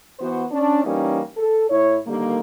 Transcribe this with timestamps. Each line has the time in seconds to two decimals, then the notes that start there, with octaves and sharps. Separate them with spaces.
0.20 E3 B3 F#4 C5
0.52 C#4 D4
0.84 E3 G3 A#3 C#4 D#4
1.37 A4
1.70 A2 E4 C#5
2.07 D3 D#3 G3 A#3